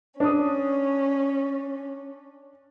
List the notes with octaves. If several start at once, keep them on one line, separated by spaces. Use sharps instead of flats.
C#4 D4 D#6